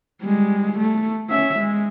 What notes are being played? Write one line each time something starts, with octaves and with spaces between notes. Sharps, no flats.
G3 G#3
A3
C#4 E5
G#3